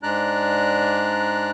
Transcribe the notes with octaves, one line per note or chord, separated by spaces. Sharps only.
G#2 G#3 D4 D5 A#5 F#6